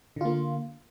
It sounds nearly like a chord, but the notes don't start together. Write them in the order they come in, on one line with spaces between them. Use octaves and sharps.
D3 F4 A#3